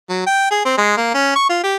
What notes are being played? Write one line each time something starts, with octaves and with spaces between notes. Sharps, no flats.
F#3
G5
G#4
C4
G#3
A#3
C#4
C#6
F4
G4